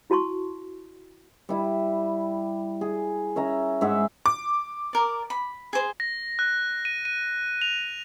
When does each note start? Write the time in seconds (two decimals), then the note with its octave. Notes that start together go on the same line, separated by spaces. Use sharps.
0.10 E4 F#4 A5 C6 C#6
1.49 G3 E4
2.81 G#4
3.36 C#4 E5 A#5
3.81 G#2 G#4 E5 F#5
4.26 D6
4.93 A#4 D5
5.30 B5
5.73 G#4 C5
6.00 A#6
6.39 F#6
6.85 D#7
7.05 D#7
7.62 F7